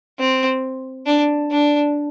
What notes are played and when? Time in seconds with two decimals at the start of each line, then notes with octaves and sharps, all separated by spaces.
0.19 C4
1.06 D4
1.51 D4